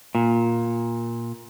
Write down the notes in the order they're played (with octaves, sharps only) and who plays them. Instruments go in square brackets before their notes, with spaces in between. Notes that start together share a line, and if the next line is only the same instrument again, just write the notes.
[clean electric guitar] A#2